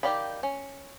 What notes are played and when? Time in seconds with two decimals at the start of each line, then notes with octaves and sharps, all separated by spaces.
0.03 D#3 G4 D5 F5 B5
0.43 C#4